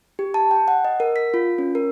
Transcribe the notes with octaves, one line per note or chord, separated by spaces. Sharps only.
G4
A5
G5
F#5
D#5
A#4
B6
F4
C#4
A#4